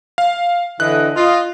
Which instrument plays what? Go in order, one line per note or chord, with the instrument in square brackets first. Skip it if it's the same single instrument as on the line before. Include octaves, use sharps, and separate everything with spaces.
[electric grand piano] F5
[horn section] D3 E3 D#5 [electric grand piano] F#6
[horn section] F4 D#5